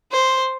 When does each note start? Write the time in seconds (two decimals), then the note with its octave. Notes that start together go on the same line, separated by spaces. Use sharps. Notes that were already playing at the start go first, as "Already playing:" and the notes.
0.11 C5